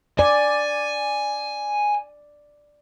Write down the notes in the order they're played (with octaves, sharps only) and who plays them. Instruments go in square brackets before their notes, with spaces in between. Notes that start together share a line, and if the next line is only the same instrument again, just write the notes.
[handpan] D5 [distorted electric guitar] G#5